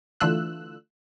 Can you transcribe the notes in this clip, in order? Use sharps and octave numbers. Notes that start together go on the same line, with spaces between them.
D3 E3 A3 F4 E6 F#6